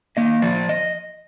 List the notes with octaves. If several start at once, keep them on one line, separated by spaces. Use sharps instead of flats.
A#3 D#5
F3 D5
D#5